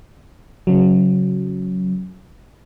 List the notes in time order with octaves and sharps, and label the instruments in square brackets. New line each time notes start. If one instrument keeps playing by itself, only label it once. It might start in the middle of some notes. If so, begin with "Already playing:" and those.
[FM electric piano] C#3 F#3